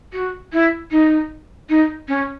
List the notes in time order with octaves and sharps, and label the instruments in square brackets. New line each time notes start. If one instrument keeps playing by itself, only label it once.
[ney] F#4
E4
D#4
D#4
C#4